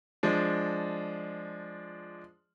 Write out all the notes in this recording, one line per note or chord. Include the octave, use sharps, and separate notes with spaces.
F3 G#3 D4